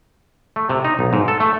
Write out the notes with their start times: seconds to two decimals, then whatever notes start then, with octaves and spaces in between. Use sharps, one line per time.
0.56 A3
0.69 C3
0.84 D#4
0.99 B1
1.13 G#2
1.28 A4
1.40 A3